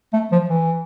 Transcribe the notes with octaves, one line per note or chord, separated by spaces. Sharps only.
A3
F3
E3